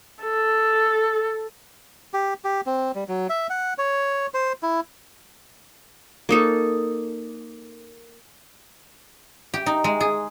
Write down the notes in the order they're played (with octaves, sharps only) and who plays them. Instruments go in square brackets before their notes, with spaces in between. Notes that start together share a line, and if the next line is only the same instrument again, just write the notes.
[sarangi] A4
[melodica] G4
G4
C4
G3
F#3
E5
F#5
C#5
C5
E4
[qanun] A#3 D#4 A4
[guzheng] G4
D#4
G#3
G#4